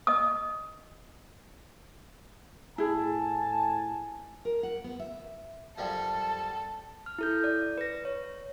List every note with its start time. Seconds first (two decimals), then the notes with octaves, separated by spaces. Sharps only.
0.07 D#5 D#6
2.78 A2 E4 G#4 G#5 A5
4.45 A#4
4.63 F#5
4.84 B3
4.99 E5
5.78 F#2 F3 G3 A4
7.06 F6
7.19 E4 A4 G6
7.44 D5
7.78 B4 A#6
8.05 C#5